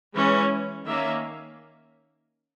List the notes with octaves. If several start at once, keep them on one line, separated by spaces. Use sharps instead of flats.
E3 G#3 C#4
D#3 A#3 C#4 E5